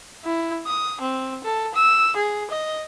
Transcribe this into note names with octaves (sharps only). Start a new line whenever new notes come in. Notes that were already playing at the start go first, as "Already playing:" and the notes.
E4
D#6
C4
A4
E6
G#4
D#5